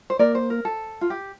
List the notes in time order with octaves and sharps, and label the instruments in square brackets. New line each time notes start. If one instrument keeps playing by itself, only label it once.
[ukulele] C5
[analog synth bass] A#3 [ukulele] A#4 D5
[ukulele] C5
A#4
A4
F4
G4